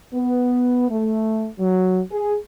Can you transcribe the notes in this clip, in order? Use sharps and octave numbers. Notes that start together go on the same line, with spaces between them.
B3
A3
F#3
G#4